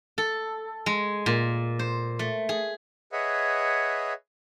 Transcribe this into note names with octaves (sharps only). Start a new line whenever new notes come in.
A4
G#3
A#2
C5
A3
G#4
G#4 B4 C#5 D#5 E5 F#5